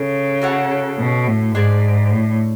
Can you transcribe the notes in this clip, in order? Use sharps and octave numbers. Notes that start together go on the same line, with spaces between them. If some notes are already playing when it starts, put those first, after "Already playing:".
Already playing: C#3 A4
F#4 A4 C#5 F#5
B2
A2
G#2 D4 G#4 D5 A5
A2